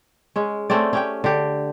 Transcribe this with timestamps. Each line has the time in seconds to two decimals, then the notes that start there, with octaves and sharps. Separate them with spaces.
0.36 G#3 C#4
0.70 A3 C4 C#4 D5
0.93 C#4 G4 G5
1.24 D3 G4